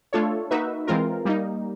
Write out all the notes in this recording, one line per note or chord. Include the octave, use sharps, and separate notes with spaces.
A3 D4 F4 A4 C#5
A#3 D#4 F#4 B4 E5
E3 G#3 C4 F4 A#4
G3 A#3 D#4